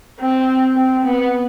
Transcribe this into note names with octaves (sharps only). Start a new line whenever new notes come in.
C4
C4
B3